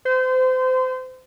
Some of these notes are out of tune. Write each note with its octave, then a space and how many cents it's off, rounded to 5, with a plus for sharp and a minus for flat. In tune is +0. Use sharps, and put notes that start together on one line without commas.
C5 -30